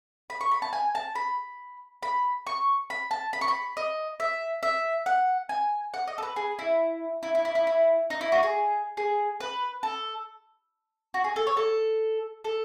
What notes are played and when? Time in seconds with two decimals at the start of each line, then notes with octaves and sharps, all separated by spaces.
0.30 B5
0.41 C#6
0.51 B5
0.62 A5
0.73 G#5
0.95 A5
1.15 B5
2.03 B5
2.47 C#6
2.90 B5
3.11 A5
3.33 B5
3.41 C#6
3.48 B5
3.77 D#5
4.20 E5
4.63 E5
5.06 F#5
5.49 G#5
5.94 F#5
6.07 D#5
6.18 A4
6.23 B4
6.36 G#4
6.59 E4
7.23 E4
7.35 E4
7.45 E4
7.55 E4
7.67 E4
8.10 D#4
8.21 E4
8.32 F#4
8.43 G#4
8.97 G#4
9.40 B4
9.83 A4
11.14 F#4
11.24 G#4
11.36 A4
11.47 C#5
11.57 A4
12.44 A4